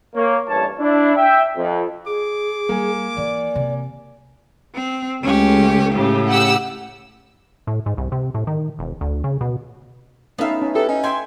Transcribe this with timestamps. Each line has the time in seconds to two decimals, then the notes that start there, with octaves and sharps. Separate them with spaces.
0.15 A#3 C#5
0.48 A1 G2 G3 C#5 A5
0.79 D4 E4
1.17 E5 G5
1.57 F2
2.07 G#4 D6
2.69 G3 A#3 G#5
3.17 E3 D5
3.56 C3
4.74 C4
5.23 C#2 A3 C#4 G4
5.93 A2 C#3 G4
6.27 G4 F#5 E6
7.67 A2
7.86 G#2
7.97 C2
8.12 C3
8.34 A2
8.47 D#3
8.79 E1
9.01 D2
9.24 C#3
9.41 B2
10.38 A3 B3 C#4 D#4 E5 F5
10.62 C#4
10.75 E4 G4 A4 B4
10.88 C#4 D#4
11.04 E5 G5 G#5 C6